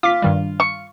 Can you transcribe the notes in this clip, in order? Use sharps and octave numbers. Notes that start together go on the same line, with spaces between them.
F4 D6 B6
G2 D#3 G3
C#6